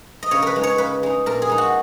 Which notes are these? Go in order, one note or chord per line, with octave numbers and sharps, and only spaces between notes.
D#5
C#3 C#5
A#4 B4
G#3 D#4
C#5
C#3 B4
G#3 D#4
A#2 A#4
G#4
G#3 D#4
F#4